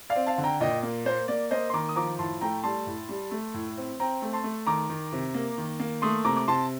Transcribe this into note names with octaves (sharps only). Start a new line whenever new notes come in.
D5 F5
C4
F5 A5
D3
G5 A#5
A#2 D#5 G5
A#3
A#3 C5
A#3 D5
A#3 C5 D#5
C6
D#3 A#5 D6
D#6
F3 A#5 D6
A2 A5 C6
A3 G5 A#5
G3 A5 C6
A2
G3
A3
A2
C4
C4 G5 A#5
A3
A5 C6
A3
D#3 A#5 D6
D#3
C3
A#3
D#3
A#3
A3 C6 D#6
C3 A#5 D6
D6
C3 A5 C6